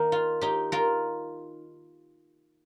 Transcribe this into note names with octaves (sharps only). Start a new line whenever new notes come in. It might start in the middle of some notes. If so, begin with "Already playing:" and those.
Already playing: D#3 A#3 D#4 A#4
F4
D#4 G4
F4 A#4